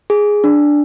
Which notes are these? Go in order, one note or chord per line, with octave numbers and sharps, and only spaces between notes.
G#4
D4